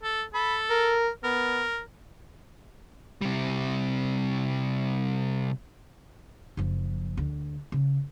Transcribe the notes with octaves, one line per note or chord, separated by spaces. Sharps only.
A4
A4 B5
A#4
B3 A#4
C3 G3
F#1 F3
D2 D3
C#3